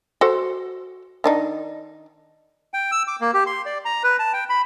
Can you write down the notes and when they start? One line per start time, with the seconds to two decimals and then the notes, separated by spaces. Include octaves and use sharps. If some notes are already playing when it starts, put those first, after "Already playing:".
0.21 F#4 A4 C5
1.24 D#3 D4 D#4
2.74 G5
2.92 E6
3.07 D6
3.21 A#3
3.34 G4
3.47 C6
3.66 D5
3.85 A#5
4.03 B4
4.19 A5
4.33 G5
4.49 B5